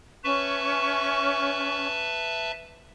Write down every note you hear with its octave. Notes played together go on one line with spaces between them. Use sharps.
C#4 B4 E5 A5 C#6